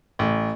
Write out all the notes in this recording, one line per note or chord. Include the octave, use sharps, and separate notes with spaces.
A1